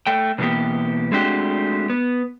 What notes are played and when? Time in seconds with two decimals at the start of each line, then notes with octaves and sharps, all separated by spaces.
0.07 A3 G5
0.38 B2 E3 A#3 B3 G4
1.12 G#3 A3 C4 D4 F#4 G4
1.90 B3